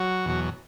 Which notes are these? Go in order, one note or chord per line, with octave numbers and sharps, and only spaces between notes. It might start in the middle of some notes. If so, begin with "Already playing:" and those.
Already playing: F#3 F#4
E2 B2 F#3